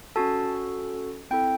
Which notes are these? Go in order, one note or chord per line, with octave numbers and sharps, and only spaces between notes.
C#4 F#4 A4 A5
C4 E4 A4 G5